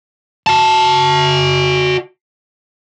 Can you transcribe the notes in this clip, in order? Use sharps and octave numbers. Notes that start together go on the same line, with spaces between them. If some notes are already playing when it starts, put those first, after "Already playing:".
F#4 A5